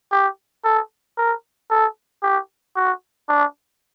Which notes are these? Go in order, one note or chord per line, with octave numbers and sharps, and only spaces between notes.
G4
A4
A#4
A4
G4
F#4
D4